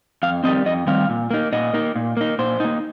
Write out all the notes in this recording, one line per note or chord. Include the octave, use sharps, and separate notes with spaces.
F2 F5
D#3 G3 C4 D#5
F2 D#5
D#3 G3 C4 F5
A#2
A#3 D#4
A#2 D#5
A#3 D#4
A#2
A#3 D#4
A#2 C5
A#3 D#4